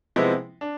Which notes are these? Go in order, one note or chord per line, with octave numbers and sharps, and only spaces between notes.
C3 F3 G#3 B3 E4
D4